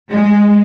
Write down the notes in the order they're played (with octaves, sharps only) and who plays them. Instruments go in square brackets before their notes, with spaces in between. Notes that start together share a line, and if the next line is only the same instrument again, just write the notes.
[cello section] G#3